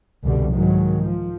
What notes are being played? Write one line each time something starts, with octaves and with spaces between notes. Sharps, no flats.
C2 F2 B2 D3 G3
G#2 D#3 F#3 G#3
F3